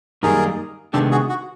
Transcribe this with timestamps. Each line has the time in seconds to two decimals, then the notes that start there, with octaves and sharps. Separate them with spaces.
0.23 F#2 D#3 G3 A#3 D#4 G#4 A#4
0.93 C3 D#3 G#3 B3 D4 G4 A4
1.11 F#4 G#4
1.29 F#4